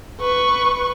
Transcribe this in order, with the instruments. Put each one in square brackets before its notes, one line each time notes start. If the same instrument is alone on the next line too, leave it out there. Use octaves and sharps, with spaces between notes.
[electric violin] B4 C#6